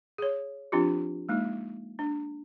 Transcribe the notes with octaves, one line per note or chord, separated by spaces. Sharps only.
G#4 C#5
F3 C4 D4 F4 G4
G#3 A#3 D#4
D4